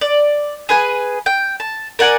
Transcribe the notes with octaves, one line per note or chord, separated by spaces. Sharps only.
D5
G#4 B4 G#5
G5
A5
A#4 D5 F#5 G#5